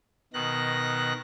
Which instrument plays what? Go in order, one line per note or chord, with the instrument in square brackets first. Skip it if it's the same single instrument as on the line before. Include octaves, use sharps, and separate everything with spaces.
[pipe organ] B2 D#3 F#6 A#6